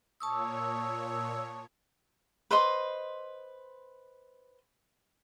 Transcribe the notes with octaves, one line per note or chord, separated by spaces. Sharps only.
A#2 C#5 A5 C#6 D#6 E6
B4 C5 D#5 C6